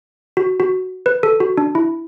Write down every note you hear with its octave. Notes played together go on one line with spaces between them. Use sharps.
F#4
F#4
B4
A4
F#4
D4
E4